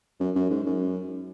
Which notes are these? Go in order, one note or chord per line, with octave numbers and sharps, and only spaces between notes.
F#2
F#2
G#2
F#2